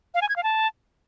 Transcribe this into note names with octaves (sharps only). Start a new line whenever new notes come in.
F5
G#5
G#6
F5
A5